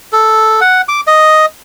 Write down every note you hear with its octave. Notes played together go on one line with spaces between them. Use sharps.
A4
F#5
D6
D#5